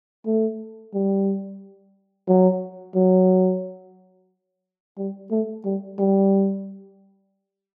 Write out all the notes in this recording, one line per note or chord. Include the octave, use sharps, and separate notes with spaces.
A3
G3
F#3
F#3
G3
A3
G3
G3